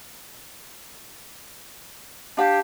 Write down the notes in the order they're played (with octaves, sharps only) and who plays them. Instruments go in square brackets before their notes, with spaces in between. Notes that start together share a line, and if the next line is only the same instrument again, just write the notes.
[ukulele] D4 F5 [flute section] G4 A5